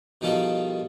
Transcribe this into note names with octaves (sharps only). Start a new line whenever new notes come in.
B2 D#3 F3 G3 A4